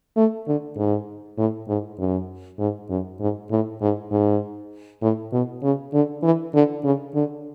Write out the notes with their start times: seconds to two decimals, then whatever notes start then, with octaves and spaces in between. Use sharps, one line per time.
0.16 A3
0.47 D3
0.77 G#2
1.38 A2
1.68 G#2
1.98 F#2
2.59 G#2
2.89 F#2
3.20 G#2
3.50 A2
3.81 G#2
4.11 G#2
5.02 A2
5.32 B2
5.63 C#3
5.93 D3
6.23 E3
6.54 D3
6.84 C#3
7.14 D3